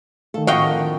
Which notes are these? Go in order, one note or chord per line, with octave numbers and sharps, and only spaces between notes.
D#3 A3 A4 F5
F2 A2 D3 F#4 D#5 F5 G5 C#6
A#4